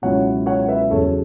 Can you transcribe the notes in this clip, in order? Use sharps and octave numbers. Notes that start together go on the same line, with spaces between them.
C#2 B2 F#3 C#4 E4 C#5 F#5
C#5 F#5
B4 E5
E2 C#3 F#3 A4 C#5